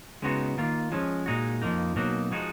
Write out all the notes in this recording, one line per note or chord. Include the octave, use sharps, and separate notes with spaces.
C#3 G#3 B3 D#4 F#4
D#3 A#3 F4
F3 G#3 C#4
A#2 G#3 D#4 F#4
F2 F3 A#3 D#4
B2 F#3 A#3 D#4 F#4
F3 G#3 D#4 F#4